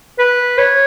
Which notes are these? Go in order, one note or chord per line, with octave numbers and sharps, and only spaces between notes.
B4
C#5